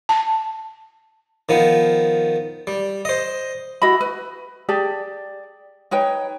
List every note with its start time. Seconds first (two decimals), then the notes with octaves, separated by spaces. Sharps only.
0.09 A5
1.49 D#3 F3 B3
2.67 G3
3.05 C5 D#5
3.82 E4 F#4 D#5 B5
4.01 B4
4.69 G4 G#4 D5 A5
5.91 D#4 B4 C#5 G5